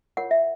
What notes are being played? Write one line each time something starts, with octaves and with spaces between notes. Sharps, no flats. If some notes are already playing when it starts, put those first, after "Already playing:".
F4 A#4 C#5 F#5
E5